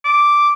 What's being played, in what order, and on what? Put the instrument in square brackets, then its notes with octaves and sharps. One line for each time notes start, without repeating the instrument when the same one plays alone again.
[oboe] D6